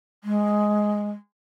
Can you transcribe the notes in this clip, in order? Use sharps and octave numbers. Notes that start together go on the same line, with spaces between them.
G#3